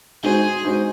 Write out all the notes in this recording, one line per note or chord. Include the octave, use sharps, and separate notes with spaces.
G#3 D#4 F#4 G#4 C5
G#3 D#4 F#4 C5